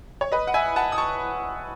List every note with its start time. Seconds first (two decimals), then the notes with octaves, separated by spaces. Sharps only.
0.21 C#5
0.32 B4 D#5
0.47 F#5
0.54 E5 G#5
0.76 F#5 A5
0.92 D#6
0.98 A5 C#6